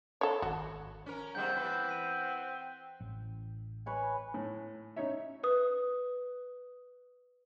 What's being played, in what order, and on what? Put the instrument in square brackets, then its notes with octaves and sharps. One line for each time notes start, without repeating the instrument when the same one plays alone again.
[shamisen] A4 C#5
[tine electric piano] G#1 [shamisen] F#4
[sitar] C#4 A#4
[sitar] G#2 G3 A#3 [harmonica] C4 F#5 G5 [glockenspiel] G6
[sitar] E3 B4
[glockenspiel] B6 D#7
[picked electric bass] A1
[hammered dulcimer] B4 C#5 G#5
[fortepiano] A2
C#4 D#4 C#5 E5
[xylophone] B4 D#6